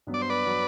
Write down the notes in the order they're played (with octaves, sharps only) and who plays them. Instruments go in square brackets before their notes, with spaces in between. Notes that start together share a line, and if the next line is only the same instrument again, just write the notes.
[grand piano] G2 F#3 B3
[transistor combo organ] D5
C5
B4 D5
[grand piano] F#3 B3